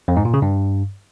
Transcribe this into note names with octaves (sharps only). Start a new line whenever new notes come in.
F2
G#2
A#2
C#3
G2